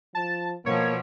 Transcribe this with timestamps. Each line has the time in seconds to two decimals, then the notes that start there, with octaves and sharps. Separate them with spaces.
0.15 F3 A5
0.66 B2 F3 A#3 C#5